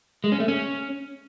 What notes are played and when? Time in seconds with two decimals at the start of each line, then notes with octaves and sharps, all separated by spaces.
0.24 G#3
0.32 C#4
0.40 A3
0.48 C#4